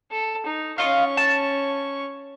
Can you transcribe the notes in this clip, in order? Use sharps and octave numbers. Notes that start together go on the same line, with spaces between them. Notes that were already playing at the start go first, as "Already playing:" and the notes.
A4
D#4
C#4 F4 D#5 F5 C#6
A5